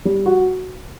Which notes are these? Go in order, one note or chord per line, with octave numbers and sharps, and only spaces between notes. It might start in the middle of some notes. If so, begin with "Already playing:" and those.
G3
F#4